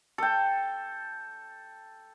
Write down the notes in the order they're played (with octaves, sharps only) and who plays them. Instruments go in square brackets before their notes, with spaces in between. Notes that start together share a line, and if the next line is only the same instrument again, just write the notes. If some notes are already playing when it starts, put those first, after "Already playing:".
[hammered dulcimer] A4 G5